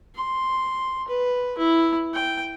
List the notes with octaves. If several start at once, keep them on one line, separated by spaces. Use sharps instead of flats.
C6
B4
E4
G5